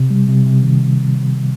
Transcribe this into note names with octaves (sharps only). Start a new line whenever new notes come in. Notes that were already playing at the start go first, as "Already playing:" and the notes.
Already playing: C3
G3
C3
C3
D#3